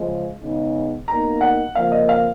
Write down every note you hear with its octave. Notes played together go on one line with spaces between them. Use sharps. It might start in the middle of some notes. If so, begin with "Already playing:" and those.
Already playing: C#3 F3 G#3
C#3 G#3 B3 D#4
B2 A#3 D#4 A#5
F#5
F2 C#3 F3 A#3 F5
D#5
F5